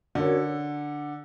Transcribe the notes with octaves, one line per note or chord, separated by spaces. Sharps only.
D3 C#4 F#4 A#4 C#5